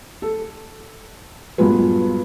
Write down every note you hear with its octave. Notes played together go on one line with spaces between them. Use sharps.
A4
G2 A#2 F3 F#3 G#3 B3